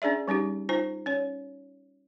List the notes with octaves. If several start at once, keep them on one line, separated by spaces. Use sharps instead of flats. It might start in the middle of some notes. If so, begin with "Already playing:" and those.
C#4 D4 G#4 D5 E5
G3 C#4 D#4 G4
D#4 F4 C5
C#4 C#5